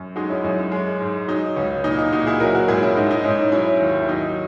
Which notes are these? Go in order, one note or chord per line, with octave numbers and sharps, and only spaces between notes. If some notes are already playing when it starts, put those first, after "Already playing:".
Already playing: F#2
G#3 D#4 F#4
C#4 E4
F#2 D#4
C#4
G#3
G#2
F#3 D#4
C#2 C#4
A#2 D#4
D#4
A#2 D#4 F#4
E4 G#4
F#3 F#4 A#4
F#4 A#4
G#2 E4 G#4
C#4 E4
G#2 D#4
D#4
G#2 C#4 E4
D#4
F#3 C#4 E4
D#2
E4
F#3 D#4